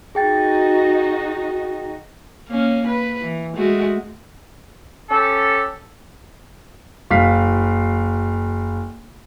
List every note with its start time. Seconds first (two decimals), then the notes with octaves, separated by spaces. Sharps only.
0.15 D#4 F#4 G#4 G5 A6
2.49 A#3 C#4
2.86 B4
3.21 E3
3.56 G#3 A3 F#4
5.10 C#4 G4 A4
7.11 F#1 F5 B6